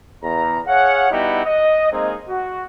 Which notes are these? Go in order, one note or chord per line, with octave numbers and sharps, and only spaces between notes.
E2 A#5
G#4 C#5 F5 F#5
G3 B3 D#4 E4 F#4 G4
D#5
G#3 A#3 C4 D#4 G#4
F#4